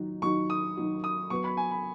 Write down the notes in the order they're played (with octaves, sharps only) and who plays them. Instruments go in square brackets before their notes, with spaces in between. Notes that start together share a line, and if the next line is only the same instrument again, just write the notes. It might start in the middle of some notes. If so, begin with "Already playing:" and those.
Already playing: [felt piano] D#3 F#3 D#4 F#4
[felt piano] D#3 F#3 D#4 F#4 [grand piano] C#6
[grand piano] D#6
[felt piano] D#3 F#3 D#4 F#4
[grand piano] D#6
[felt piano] F#3 B3 F#4 B4 [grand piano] C#6
[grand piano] B5
G#5
B5